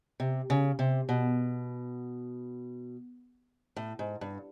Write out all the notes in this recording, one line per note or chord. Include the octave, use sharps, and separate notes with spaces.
C3
C#3
C3
B2
A2
G#2
G2